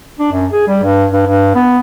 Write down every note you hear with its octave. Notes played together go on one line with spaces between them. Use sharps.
D4
F#2
G#4
G3
G2
G2
G2
B3